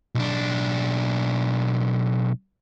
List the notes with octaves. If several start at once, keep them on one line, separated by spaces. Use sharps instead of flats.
B1 D4